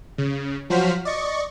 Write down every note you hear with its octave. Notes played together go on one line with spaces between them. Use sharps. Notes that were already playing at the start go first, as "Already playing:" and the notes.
C#3
F3 F#3 F#4 C5 F6 B6
D5 D#5 C#6